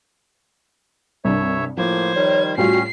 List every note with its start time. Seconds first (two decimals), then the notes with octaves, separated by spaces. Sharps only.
1.25 C2 G2 C#5 E5
1.77 A2 F3 A#3 C5 G#6
2.15 D#3 G3 C#5
2.57 A2 G3 C#4 F4 F#4 C7